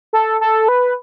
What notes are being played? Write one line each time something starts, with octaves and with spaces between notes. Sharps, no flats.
A4
A4
B4